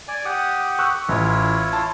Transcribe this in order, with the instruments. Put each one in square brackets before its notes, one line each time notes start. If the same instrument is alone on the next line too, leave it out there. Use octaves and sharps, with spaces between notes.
[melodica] D5 G#5
G4 F#5 D#6
[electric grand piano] C#6 E6 F#6
[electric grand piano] A1 [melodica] E4 F4 C#5
[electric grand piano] A5 C6